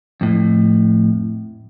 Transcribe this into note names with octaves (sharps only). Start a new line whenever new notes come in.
F2 A2